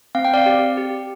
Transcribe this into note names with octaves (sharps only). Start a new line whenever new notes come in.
C4 F5
G5
D5 F5
G4
G4